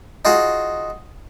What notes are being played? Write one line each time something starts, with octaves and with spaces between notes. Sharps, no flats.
D#4 F4 F#4 G#4